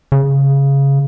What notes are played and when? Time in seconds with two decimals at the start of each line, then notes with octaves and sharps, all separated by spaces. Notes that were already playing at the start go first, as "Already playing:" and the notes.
0.12 C#3